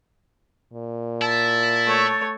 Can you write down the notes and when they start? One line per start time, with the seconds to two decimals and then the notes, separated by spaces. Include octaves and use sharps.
0.73 A#2
1.22 E4 A5
1.86 A3 C#5